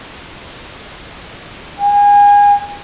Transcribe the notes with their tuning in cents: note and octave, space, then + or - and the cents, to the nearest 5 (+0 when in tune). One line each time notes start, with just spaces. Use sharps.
G#5 -30